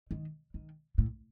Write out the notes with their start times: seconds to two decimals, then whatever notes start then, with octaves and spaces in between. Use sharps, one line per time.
0.11 D#3
0.54 D#3
0.98 A2